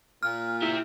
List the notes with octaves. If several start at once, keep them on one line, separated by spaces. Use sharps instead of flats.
A#2 F6
E4 G4 E5